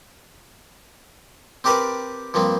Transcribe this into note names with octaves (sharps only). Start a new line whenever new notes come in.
C4 D4 G4 A#4 B4 D5
G2 F3 A#3 C4